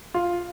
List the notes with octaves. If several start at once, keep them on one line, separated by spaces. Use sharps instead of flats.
F4